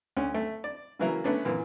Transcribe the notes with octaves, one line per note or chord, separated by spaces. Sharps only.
D2 C#4
A3
D5
C#3 E3 F#3 A#3 E4 A#4
A3 B3 C#4 D4
F#2 A#2 E3